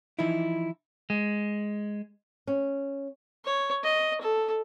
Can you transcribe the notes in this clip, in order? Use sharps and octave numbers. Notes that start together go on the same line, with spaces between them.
E3 F3 D#4 E4
G#3
C#4
C#5
D#5
A4